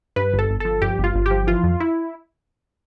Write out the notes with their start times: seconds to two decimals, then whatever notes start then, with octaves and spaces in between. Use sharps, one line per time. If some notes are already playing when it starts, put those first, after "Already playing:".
0.16 G2 B4
0.33 G1
0.39 A4
0.49 G1
0.60 F3 A4
0.82 G2 G4
0.99 G1
1.04 F4
1.15 G1
1.26 F3 G4
1.47 E3 F4
1.64 F2
1.80 E4